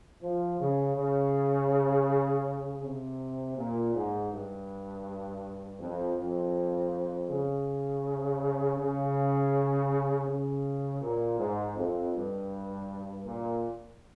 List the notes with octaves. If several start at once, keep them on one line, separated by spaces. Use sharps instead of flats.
F3
C#3
C#3
C3
A#2
G#2
G2
F2
F2
C#3
C#3
C#3
A#2
G#2
F2
G2
A#2